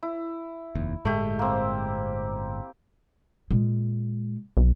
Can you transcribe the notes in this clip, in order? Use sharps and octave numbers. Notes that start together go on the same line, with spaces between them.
E4
F1 D#2
G1 A2 G#3 A3 G4
A#3 C4
A#2 G#3
B1